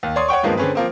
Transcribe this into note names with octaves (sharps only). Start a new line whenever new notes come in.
D#2
C#5 D5 C6 D#6
C#5 F#5 G5 C#6
G2 D#3 F3 G#3 A#3 B3
D3 C4 C#4 G#4 B4
F3 A#3 C4